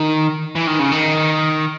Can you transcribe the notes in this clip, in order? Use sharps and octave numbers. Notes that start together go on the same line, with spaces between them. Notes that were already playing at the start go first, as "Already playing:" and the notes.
Already playing: D#3
E3
D#3
C#3
D#3